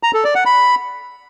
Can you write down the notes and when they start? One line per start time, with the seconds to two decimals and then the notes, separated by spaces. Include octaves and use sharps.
0.03 A#5
0.14 A4
0.24 D5
0.35 F#5
0.46 B5